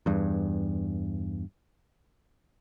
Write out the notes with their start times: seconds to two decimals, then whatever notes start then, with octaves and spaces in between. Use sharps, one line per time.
0.06 E2 G2